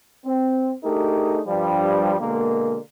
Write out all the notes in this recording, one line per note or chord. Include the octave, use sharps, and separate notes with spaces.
C4
A3 D4 D#4 G4 G#4 A#4
G2 F3 G3
B2 D3 G#3 A#3